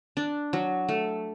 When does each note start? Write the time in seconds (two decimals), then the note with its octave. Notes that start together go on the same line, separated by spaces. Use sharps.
0.17 D4
0.53 F#3
0.89 A3